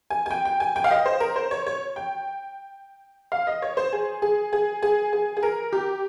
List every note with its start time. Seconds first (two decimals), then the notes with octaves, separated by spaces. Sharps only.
0.10 G#5
0.26 G#5
0.31 G5
0.45 G5
0.60 G#5
0.76 G5
0.84 F5
0.91 D#5
1.06 C5
1.20 A#4
1.36 C5
1.51 C#5
1.67 C#5
1.96 G5
3.32 F5
3.47 D#5
3.62 C#5
3.77 C5
3.93 G#4
4.22 G#4
4.53 G#4
4.83 G#4
5.13 G#4
5.37 G#4
5.43 A#4
5.73 G4